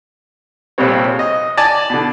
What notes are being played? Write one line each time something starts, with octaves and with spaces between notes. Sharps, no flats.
A#1 F2 C3 G3 C4 C#5
D#5
D5 G#5 A5
B2 D3